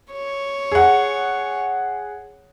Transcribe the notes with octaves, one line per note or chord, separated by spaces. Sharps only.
C#5
G#4 F#5